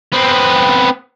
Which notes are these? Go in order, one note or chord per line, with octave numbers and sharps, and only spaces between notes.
B3 C4